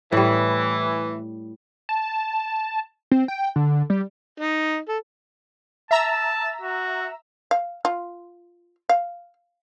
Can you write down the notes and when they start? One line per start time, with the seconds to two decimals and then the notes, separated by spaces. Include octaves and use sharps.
0.12 A2 E3 G3
1.89 A5
3.11 C4
3.28 G5
3.56 D3
3.90 G3
4.40 D#4
4.88 A4
5.91 E5 A5 A#5 E6
6.61 F#4
7.51 F5
7.85 F4
8.89 F5